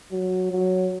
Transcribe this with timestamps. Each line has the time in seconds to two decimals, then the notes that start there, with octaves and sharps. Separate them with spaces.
0.12 F#3
0.52 F#3